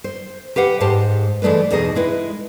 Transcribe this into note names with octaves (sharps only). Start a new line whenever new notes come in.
C5
G4 B4 F5 F#5
G#2 G4 C5 A5
E3 G#3 A3 D4 B4
E2 B2 D#4 G#4 D#5
G#3 E4 B4